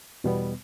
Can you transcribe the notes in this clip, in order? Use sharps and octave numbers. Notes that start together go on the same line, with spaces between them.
E2 B2 G3 B3